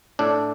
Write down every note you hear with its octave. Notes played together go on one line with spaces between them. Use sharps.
A2 D4